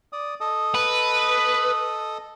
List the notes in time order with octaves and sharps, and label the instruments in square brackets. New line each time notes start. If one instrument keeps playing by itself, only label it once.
[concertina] D5 D#6
A4 D#5 D#6
[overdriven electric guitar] B4